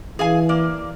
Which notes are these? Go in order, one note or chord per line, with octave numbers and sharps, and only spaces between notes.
E3 G#4 F5 G#5
A#3 D5